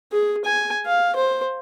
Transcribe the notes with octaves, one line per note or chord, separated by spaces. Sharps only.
G#4
G#5
F5
C5